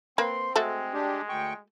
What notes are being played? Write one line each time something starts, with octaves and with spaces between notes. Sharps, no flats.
A#3 C4 B4 C6
G#3 A3 F#4 A4
D4 G4
D2 G5 C#6